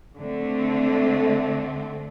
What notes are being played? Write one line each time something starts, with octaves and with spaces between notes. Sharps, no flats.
D3 A3 C4